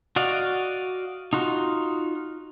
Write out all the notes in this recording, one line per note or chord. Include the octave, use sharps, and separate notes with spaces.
F#4 D5 D#5 F5
D#4 F4 F#4